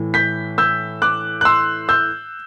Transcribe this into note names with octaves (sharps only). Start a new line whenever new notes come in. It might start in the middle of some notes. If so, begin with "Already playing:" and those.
Already playing: A2 E3
G6 B6
E6 G6
D6 F#6
F#6
C6 E6
E6 G6